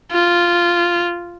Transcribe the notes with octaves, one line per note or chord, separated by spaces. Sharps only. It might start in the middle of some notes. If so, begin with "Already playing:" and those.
F4